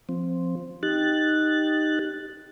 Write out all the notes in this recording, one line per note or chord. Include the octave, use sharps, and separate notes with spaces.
F3 C4
D#4 G4 F#6 A6